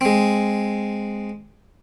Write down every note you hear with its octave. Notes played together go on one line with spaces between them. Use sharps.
G#3 C4